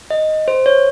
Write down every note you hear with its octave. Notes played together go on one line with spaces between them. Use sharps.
D#5
C5
C#5